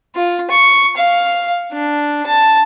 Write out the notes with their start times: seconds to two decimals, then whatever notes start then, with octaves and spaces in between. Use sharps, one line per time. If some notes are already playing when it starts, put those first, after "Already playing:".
0.15 F4
0.51 C#6
0.97 F5
1.73 D4
2.27 A5